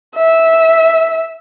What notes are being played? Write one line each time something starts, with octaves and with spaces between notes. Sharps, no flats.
E5